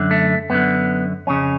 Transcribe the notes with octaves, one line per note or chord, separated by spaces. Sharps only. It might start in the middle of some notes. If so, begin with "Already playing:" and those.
Already playing: F#2 D3
A3
F#2 D3 B3
F2 C#3 C#4